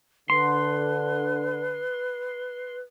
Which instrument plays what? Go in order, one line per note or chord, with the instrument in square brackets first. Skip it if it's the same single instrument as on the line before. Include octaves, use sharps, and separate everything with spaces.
[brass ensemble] D3 [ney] B4 [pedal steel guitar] C6